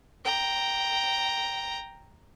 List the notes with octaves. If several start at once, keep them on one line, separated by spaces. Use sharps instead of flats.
G5 A#5